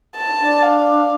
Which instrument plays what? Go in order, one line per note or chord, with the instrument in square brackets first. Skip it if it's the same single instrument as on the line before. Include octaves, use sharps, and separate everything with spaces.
[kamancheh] A5
[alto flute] D4
[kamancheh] F5